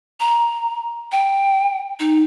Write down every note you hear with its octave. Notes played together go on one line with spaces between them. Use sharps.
A#5
G5
D#4